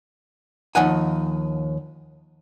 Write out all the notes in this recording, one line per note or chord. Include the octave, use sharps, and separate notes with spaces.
D#2 F3 D#4 F#5 G#5